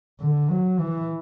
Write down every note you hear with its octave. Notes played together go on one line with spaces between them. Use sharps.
D3
F#3
E3